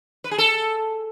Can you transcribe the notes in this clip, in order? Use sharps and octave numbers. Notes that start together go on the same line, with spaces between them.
B4
G#4
A4